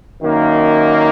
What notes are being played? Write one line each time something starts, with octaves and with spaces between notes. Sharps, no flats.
F#2 D#3 A#3 D#4